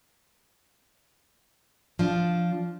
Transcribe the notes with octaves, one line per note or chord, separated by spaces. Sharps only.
F3 D4